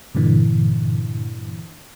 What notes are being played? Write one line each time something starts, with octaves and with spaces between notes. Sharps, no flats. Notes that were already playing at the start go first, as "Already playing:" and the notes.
G2 A#2 D3 E3